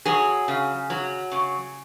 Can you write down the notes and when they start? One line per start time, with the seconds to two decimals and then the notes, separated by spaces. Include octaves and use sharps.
0.05 F#3 G#4
0.48 C#3
0.90 F#3
1.32 C#3